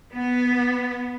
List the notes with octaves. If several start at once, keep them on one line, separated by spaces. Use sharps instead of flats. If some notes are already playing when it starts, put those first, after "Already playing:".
B3